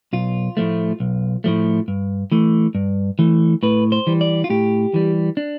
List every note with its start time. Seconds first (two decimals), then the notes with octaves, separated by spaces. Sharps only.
0.13 B1 F4
0.57 A2 F3 A3
1.00 B1
1.44 A2 F3 A3
1.88 G2
2.32 E3 A3
2.75 G2
3.19 E3 A3
3.63 A2 B4
3.92 C5
4.07 E3 G3
4.21 D5
4.44 F4
4.50 A2 G4
4.94 E3 G3
5.37 D4